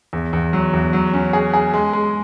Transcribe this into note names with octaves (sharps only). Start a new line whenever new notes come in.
E2
E2
F#3
E2
F#3
C#4
G#4
G#4
G#3
G#3